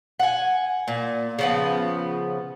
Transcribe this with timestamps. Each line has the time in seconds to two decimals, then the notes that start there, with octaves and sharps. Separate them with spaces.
0.20 F#5 G#5
0.88 A#2
1.39 C#3 F3 B3